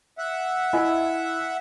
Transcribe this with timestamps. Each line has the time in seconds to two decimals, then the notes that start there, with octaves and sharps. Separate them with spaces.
0.18 E5 F#5
0.73 E4 D#5 G#5